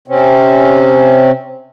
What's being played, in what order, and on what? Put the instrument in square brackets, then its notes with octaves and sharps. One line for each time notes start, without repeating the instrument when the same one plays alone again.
[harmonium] C3 C4 C#4